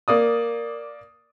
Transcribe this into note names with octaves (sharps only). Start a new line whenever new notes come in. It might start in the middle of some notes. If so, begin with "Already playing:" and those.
A#3 D5 D#6